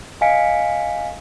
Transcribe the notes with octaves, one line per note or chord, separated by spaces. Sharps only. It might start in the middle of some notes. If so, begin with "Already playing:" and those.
D#5 F5 G#5 B6 C#7 D7